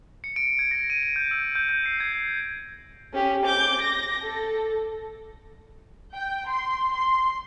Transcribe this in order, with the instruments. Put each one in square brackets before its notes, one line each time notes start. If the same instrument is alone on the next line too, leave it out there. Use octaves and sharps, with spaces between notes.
[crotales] C#7
D7
G#6
A#6
D#7
D#7
G6
E6
G6
G6
C7
G#6
[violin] C#4 G4
D6 G6
A#6
A4
[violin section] G5
C6
C6